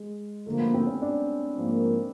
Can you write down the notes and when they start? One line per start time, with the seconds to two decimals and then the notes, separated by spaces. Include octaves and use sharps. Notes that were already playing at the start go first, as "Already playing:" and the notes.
Already playing: G#3
0.46 D3 F3 A3 A#3
0.60 B3
0.74 C4
0.87 C#4
1.02 D4
1.58 G#2 F3 A#3